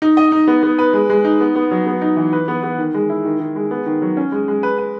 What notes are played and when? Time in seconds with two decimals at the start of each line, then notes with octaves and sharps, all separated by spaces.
0.02 D#4
0.17 D#5
0.32 D#4
0.47 B3
0.63 B3
0.79 B4
0.93 G#3
1.10 G#3
1.24 D#4
1.40 B3
1.56 B3
1.71 F#3
1.86 B3
2.01 D#4
2.17 E3
2.33 B4
2.48 B3
2.63 B3
2.78 D#3
2.94 G#3
3.09 E4
3.24 D#3
3.40 D#3
3.56 G#3
3.71 B3
3.86 D#3
4.02 F#3
4.17 C#4
4.32 G#3
4.48 G#3
4.63 B4
4.78 B4